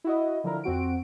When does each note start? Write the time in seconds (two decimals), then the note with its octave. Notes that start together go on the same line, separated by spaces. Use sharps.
0.04 E4 F#4 D#5
0.44 D3 F3 E4 A#4
0.64 F2 C4 F#4 D7